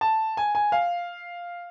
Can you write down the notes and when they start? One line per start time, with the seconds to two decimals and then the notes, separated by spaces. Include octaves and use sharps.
0.01 A5
0.37 G#5
0.55 G#5
0.72 F5